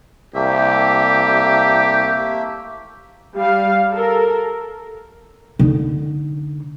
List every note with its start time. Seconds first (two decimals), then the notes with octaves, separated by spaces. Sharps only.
0.35 C2 A3 A#3 G4 E5
3.36 G3 F5
3.91 A4 A#4
5.59 D3 D#4